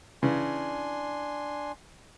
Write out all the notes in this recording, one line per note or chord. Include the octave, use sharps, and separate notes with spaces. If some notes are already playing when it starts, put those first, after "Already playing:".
C#3 E3 D4 G#5 C6